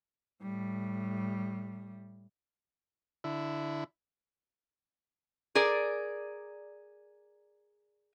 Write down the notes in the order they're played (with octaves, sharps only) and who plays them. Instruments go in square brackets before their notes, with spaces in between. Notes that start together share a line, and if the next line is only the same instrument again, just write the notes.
[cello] A2 G3
[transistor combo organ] D3 E4
[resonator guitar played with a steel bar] G#4 A#4 D5